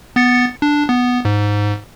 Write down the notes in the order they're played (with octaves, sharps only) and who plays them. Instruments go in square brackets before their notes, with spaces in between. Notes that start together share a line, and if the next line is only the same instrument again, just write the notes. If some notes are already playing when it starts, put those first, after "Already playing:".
[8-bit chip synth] B3 A6 C#7
D4
B3
G#2